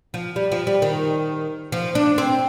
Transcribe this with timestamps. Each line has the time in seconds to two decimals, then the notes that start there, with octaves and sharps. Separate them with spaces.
0.14 F3
0.36 G3
0.52 F3
0.67 G3
0.82 D#3
1.72 F3
1.95 D4
2.18 C4